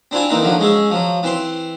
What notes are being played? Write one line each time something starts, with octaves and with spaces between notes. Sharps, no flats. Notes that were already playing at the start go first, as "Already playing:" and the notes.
C4 D4 E4 F4 G#5
E3 A#3 C4 D#4
D3 F3 F#3
G#3 C#4 G#4 E5
F3 F#3
E3 C4 C6